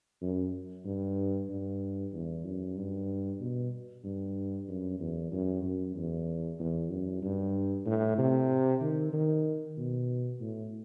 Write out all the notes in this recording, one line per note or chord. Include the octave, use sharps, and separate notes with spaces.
F#2
G2
G2
E2
F#2
G2
B2
G2
F#2
E2
F#2
F#2
E2
E2
F#2
G2
A2
C3
D#3
D#3
B2
A2